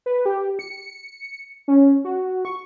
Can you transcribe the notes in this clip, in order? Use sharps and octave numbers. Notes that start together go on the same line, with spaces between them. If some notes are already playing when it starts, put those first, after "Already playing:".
B4
G4
C#7
C#4
F#4
C#6